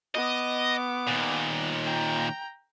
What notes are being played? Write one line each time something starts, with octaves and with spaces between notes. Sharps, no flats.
B3 D#5 D6
D#2 A#2
G5 A#5